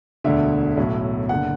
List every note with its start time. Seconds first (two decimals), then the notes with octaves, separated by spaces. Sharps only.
0.24 E1 D2 D3 E5
0.77 B1 A2 F#3
1.29 F#1 D3 F#5